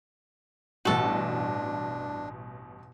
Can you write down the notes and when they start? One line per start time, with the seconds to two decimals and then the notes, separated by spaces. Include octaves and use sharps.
0.85 A1 G2 B2 F#4 A4
1.02 D4